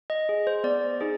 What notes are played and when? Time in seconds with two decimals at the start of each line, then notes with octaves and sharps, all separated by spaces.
0.10 D#5
0.29 G#4
0.47 C5
0.64 B3 D5
1.01 D#4 G#4